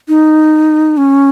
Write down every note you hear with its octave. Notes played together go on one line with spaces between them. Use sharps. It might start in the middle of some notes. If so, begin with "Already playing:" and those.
D#4
C#4